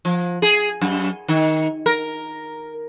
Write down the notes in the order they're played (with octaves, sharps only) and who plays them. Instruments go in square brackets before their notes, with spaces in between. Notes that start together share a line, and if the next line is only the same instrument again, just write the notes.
[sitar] F3
G#4
F#2
D#3
A#4